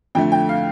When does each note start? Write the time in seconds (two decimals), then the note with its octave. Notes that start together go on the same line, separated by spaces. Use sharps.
0.15 F2 D3 A3 G5
0.32 G5
0.49 F5